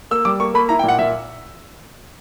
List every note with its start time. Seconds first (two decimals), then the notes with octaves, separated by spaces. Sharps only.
0.11 A#3 E6
0.25 G3 D6
0.40 A#3 C#6
0.54 A#3 B5
0.69 E4 A#5
0.79 G5
0.83 A#2 F#5
0.99 A#2 E5